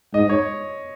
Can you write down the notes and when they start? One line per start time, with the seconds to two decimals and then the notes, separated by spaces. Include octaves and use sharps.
0.14 G#2 D#5
0.29 C#5